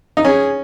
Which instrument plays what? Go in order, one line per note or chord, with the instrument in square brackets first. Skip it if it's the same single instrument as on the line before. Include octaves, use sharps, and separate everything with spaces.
[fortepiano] D#4
[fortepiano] C#4 [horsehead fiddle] G#4